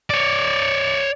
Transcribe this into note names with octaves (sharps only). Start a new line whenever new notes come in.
C#5 D5